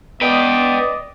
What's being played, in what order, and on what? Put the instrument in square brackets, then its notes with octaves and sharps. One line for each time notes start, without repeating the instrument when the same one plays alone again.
[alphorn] B3 [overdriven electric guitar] B4 G5 [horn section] D5 D#5